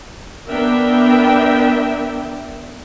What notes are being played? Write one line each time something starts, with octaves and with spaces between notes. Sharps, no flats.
B3 D4 A#4 E5 G5